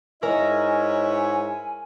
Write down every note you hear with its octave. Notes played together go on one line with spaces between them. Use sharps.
G#2 E4 A#4 C#5 D#5 G#5